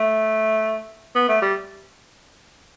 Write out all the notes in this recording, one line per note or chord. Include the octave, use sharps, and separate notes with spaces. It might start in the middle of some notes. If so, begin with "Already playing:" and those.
Already playing: A3
B3
A3
G3